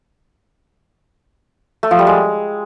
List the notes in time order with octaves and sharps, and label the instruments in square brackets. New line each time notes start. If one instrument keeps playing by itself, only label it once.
[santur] A3
F3
G3
G#3